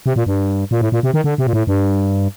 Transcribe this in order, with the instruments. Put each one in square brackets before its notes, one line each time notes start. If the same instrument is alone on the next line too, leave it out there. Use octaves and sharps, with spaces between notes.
[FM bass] C3
A#2
G2
A#2
A2
A#2
C3
D#3
D3
C3
A#2
A2
G2